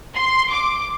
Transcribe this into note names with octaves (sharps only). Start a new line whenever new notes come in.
C6
D6